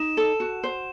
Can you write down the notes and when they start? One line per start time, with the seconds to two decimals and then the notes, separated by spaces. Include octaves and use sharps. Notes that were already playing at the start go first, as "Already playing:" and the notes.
Already playing: D#4 E7
0.17 A4
0.40 F#4
0.64 C5